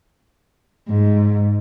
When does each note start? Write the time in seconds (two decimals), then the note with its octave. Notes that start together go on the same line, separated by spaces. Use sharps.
0.88 G#2